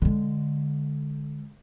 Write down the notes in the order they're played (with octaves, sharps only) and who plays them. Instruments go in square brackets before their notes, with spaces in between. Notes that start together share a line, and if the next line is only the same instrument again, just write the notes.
[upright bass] D3 G#3